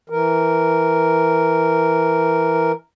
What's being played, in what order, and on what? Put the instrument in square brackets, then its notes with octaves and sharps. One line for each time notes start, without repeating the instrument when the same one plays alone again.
[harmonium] E3 A#4